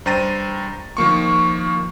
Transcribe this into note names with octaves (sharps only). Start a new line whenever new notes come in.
G2 C5 G5 A#5 A6 D#7
D#3 F3 A#3 C#6